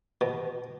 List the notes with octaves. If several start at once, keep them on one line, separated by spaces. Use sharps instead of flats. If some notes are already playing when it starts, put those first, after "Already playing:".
B2